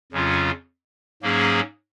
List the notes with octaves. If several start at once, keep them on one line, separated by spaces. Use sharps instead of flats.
F2 C#3 F#3 C#4 F4
G#2 F#3 A#3 C#4 G#4